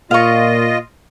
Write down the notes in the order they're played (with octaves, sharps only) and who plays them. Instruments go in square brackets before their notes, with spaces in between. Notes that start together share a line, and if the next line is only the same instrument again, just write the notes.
[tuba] A#2 [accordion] F4 D#5 [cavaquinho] F5 C#6